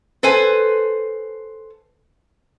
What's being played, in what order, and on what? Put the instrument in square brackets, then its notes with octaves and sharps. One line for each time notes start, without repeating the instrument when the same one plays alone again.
[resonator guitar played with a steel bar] A4 B4 C5 G#5